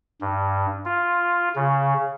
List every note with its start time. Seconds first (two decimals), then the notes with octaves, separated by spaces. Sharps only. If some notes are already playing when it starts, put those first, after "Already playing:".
0.21 G2
0.85 F4
1.55 C#3